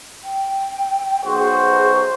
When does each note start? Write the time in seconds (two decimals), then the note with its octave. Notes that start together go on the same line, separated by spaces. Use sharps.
0.24 G5
1.25 B1 F#4 G#4 C5